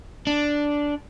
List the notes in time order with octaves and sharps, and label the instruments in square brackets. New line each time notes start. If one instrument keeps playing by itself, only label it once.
[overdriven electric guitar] D4